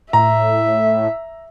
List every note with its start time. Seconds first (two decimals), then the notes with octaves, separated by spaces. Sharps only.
0.13 A2 E5 A#5